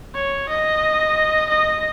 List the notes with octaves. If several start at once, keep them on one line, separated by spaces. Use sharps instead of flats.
C#5
D#5
D#5